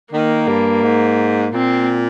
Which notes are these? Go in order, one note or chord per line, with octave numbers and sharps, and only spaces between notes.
D#3 A#3
G2
G#2
A#2 C4